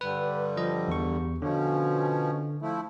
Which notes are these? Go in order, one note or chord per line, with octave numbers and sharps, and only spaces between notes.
G2 D3 G3 B4
F3 D#5
E2 C#6
B2 D3 F3 C#4
F3 A3 E4